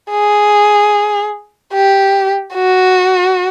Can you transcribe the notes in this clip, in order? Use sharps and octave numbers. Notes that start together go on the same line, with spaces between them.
G#4
G4
F#4